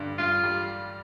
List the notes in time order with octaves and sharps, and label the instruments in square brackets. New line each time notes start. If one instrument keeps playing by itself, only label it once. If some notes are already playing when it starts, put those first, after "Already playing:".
Already playing: [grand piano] G2 D3 G3
[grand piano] G2 [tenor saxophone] F4
[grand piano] G3